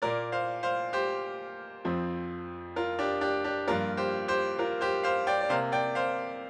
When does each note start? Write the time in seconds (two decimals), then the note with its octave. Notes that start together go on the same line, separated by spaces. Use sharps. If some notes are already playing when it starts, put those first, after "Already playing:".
0.02 A#2 A#3 A#4 D5
0.32 C5 F5
0.63 C5 F5
0.93 G4 C5
1.85 F2 F3 C4
2.76 F4 A#4
2.99 D4 G4
3.21 D4 G4
3.44 D4 G4
3.67 G2 F3 A#3 F4 A#4
3.97 G4 C5
4.28 G4 C5
4.58 F4 A#4
4.81 G4 C5
5.03 C5 F5
5.27 D5 G5
5.41 D5
5.49 C3 A#3 C5 F5
5.72 D5 G5
5.95 C5 F5